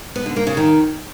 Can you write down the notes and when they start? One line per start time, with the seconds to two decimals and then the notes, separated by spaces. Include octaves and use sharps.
0.16 B3
0.26 D3
0.36 A#3
0.47 C#3
0.57 D#3